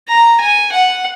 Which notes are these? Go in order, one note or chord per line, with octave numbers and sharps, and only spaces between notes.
A#5
G#5
F#5